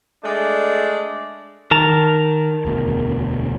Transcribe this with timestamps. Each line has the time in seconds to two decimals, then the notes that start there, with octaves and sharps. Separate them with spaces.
0.24 G#3 A3 D4 D5
1.71 D#3 A#4 A5 A#5
2.65 E1 D2 B2